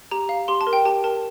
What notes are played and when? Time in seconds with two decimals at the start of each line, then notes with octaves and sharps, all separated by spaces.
0.11 G4 A#5
0.29 F5
0.48 G4 C6
0.61 A5
0.67 A#4
0.73 G5
0.85 G4 A5
1.04 A#4 A5